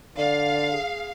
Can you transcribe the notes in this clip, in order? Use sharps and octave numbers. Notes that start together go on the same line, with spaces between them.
D3 D5 F5
G#4